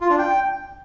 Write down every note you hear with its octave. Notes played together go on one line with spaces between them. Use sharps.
F4
D4
G5